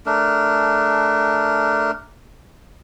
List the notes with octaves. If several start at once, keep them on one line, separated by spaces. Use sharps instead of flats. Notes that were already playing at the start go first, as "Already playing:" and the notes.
A3 D4 A#4